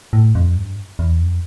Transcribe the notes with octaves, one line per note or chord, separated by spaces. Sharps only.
A2
F2
G2
E2
F2